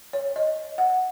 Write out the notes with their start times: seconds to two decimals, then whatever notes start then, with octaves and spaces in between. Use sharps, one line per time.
0.13 C#5
0.36 D#5
0.78 F#5